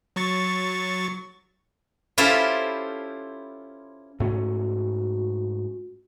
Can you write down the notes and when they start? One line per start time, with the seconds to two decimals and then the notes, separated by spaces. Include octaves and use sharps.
0.16 F#3 C#6 A6
2.18 C#4 E4 F4 G4 A4 C5
4.20 G#2 A3 C#4 F#4